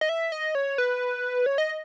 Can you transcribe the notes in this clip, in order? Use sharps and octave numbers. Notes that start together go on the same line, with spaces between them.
D#5
E5
D#5
C#5
B4
C#5
D#5